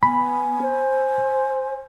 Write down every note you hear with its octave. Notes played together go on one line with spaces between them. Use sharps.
B3 G#5 B5
C5